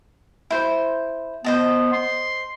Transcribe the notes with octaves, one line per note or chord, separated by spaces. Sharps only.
E4 C5
B3 C5 D#5 A5
C6